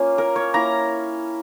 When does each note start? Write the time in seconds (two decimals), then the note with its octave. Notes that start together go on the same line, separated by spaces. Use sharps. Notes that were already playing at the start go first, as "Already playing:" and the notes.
Already playing: A#3 C#4 F4
0.18 A#4
0.36 C#5
0.54 A#3 E4 A#5